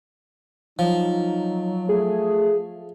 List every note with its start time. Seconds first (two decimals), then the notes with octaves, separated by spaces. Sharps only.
0.79 F3 F#3 D#4
1.89 A3 G#4